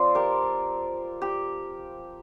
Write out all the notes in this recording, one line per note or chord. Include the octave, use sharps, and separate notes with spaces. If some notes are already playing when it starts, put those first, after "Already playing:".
Already playing: F3 C4 F4 C5 D5
G4 A#4
G4